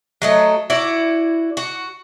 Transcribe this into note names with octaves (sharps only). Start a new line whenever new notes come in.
F#3 A3 D#5
E4 F#4 D5
F#4